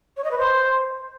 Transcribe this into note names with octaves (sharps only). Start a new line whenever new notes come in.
C#5
D#5
B4
C5